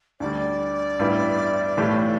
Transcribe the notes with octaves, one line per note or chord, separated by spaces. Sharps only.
D2 D3 G3 D5
A1 G2 G3 B3 E4
B1 A2 E3 A3 G4